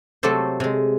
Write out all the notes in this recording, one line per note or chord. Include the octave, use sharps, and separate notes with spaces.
C3 F#3 A3 G4 A4 C5
C3 G#3